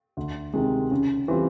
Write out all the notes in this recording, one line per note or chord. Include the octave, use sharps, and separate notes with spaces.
D2
C3 D#3 G#3
C#3
E3 G3 C4 F4